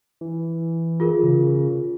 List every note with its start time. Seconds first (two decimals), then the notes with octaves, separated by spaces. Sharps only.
0.21 E3
1.00 F4 G#4 A#4
1.23 C#3